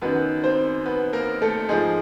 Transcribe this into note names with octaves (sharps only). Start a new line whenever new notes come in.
F#2 D#3 B3 B4
C4 C5
B3 B4
A#3 A#4
A3 A4
G#2 F3 G#3 G#4